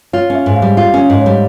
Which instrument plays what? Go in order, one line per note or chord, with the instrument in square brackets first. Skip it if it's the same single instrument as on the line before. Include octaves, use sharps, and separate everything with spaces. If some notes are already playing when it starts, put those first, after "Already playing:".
[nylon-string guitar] F4 [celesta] C#5
[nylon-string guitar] C#4
[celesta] E5
[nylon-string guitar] G#2
[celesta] F5
[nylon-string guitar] G3
[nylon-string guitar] F4 [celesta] F5
[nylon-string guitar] C#4
[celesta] F5
[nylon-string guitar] G#2
[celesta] C#5
[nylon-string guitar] G3